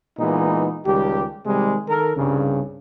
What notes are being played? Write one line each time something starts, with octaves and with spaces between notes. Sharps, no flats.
A#2 E3 G#3 B3 D#4
C#2 D#3 G3 G4
C3 D#3 G3 G#3
D#3 A4 A#4
C2 G2 C#3